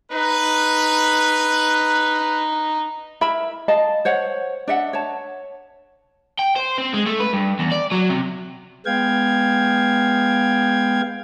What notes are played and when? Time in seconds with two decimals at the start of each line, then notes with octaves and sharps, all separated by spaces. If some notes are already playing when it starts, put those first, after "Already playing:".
0.12 D#4 B4
3.21 E4 A#4 E5 B5
3.68 D#5 F5 A5
4.05 C5 C#5 F#5
4.67 D4 D#5 E5 F#5
4.93 C#5 A5
6.39 G5
6.56 C5
6.78 C4
6.94 G#3
7.06 A3
7.20 B4
7.33 G2
7.59 E2
7.72 D5
7.91 F#3
8.10 C3
8.86 G#3 B3 F5 G5 G#6